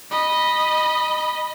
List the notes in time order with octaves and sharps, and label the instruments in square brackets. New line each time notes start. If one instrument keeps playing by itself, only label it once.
[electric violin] D#5 B5